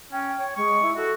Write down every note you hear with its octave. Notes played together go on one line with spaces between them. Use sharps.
C#4 G5
C#5
G#3 C#6
E4
F#4 A4